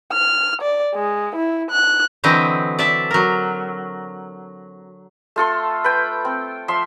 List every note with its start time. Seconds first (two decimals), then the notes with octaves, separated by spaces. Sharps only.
0.12 F6
0.62 D5
0.95 G#3
1.35 E4
1.71 F#6
2.24 D3 E3 F#3 C4 D#5 G5
2.79 D5 E5 A5
3.11 F#3 A#4
5.36 A3 F4 A4 C6
5.84 B4 G5
6.25 C4
6.68 F3 E5 C6